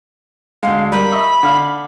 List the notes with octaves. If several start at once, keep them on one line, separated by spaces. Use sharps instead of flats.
D2 G#3 F5
G3 A#4 B5
D#5 E5 C#6
D3 F5